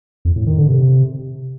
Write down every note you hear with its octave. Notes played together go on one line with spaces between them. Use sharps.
F2
A2
D#3
D3
C3